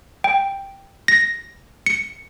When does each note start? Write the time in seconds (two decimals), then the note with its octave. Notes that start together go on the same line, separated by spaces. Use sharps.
0.24 G5
1.08 A#6
1.86 C#7